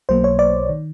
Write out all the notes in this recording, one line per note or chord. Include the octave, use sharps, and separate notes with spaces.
B1 B2 F#3 A#3 C5
C#5
D5
D#3